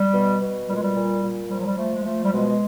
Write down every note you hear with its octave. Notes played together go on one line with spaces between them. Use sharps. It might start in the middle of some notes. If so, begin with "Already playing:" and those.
Already playing: G3
B2
B2
A#2 G3
G#3
G3
A#2
A#2
F3 G3
F#3
G3
F3 A3
G#3
F3 A3
G3
B2 G#3